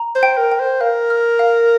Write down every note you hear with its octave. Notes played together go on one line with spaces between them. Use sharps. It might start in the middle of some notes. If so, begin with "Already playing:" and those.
Already playing: A#5
C5
G5
A#4
G5
C5
A#4 F5
F6
F5